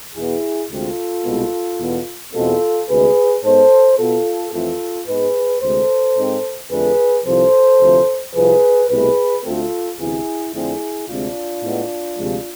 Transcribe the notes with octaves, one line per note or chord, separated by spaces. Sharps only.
E2 B2 B3 E4 G#4
D2 C3 G#3 C4 F4 A4
C2 B2 G#3 B3
E2 B2 B3
E2 B2 G#3 C4 F4 A4
D2 C3 G#3 G#4 B4
G#2 G#3 B3 A4 C5
B2 B3 F4 A4
F2 E3 A3 C4 F4 A4
G#2 G#3 B3 G#4 B4
D2 C3 G#3 A4 C5
G#2 G#3 C4
F2 D3 A3 G#4 B4
C2 C3 F3 A4 C5
D2 C3 F3
C2 C3 F3 G#4 B4
C2 B2 A3 G#4 B4
D2 D3 A3 C4 F4 A4
D2 C3 E3 B3 E4 G#4
F2 D3 A3 C4 E4 G#4
D2 C3 G#3 C4 D4 F4
A2 G#3 B3
D2 C3 F3 G#3